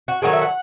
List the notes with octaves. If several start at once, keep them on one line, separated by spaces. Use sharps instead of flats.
F#4
D#3 F#3 A3 G#4
E5
F#5